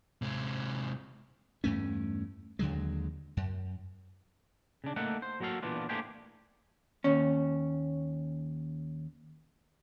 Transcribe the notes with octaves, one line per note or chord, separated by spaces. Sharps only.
C3 G#3
E2 G2 A3 C#4
D#2 D3 F#3 G#3
F#2
C#3 D4
A3 A#3 D#4 A4 F#5
C5
F#3 A#3 F#4 A4 F5
A#2 E3 B3 D4 F4
A3 A#3 D4 G4 G#4 C5
D#2 C#4